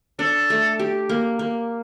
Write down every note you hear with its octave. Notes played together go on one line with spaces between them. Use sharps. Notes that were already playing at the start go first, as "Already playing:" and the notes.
D4 A4
A3
G4
A#3
A#3